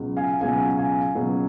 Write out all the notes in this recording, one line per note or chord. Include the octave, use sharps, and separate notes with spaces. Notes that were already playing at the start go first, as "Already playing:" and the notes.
Already playing: C#2 B2 F#3
F5 G#5
C#2 B2 F#3 F5 G#5
F5 G#5
C#2 B2 F#3